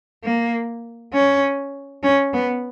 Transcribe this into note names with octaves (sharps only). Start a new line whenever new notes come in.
A#3
C#4
C#4
B3